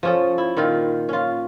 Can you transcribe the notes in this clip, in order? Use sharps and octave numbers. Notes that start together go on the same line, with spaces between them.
F3 C#4 A4
E4
A#2 D#3 F4
C#4 F4